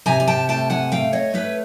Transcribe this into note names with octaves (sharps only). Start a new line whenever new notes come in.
C3 G#5 A#5
G#5
G5 A5
A3 G5 A5
F#5 G#5
A3 F5 G5
C#5 D#5
A3 B4 C#5